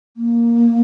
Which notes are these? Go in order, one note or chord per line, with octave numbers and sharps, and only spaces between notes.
A#3